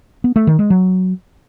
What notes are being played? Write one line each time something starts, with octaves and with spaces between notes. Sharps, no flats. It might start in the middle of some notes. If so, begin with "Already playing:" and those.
B3
A3
D#3
G#3
F#3